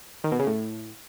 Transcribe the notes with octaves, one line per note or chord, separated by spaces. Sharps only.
D#3
B2
C#3
A2